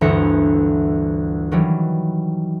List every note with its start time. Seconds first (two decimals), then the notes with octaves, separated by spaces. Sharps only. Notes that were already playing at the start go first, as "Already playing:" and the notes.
0.01 G1 D2 E3 E5 A#5 C#7
1.51 D#3 E3 F#3 G3